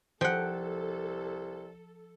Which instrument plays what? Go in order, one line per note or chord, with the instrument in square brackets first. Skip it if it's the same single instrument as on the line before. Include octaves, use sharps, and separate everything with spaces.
[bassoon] C2 [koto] F3 [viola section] A4 [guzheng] F#5 G5